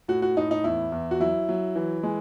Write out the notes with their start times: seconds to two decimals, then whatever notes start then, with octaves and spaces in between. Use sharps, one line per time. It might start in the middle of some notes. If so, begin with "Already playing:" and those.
0.08 A2 F#4
0.22 F#4
0.36 A2 D#4
0.51 D#4
0.64 E2 E4
0.92 E2
1.11 F#4
1.20 F#3 E4
1.49 F#3
1.75 E3
2.03 G#3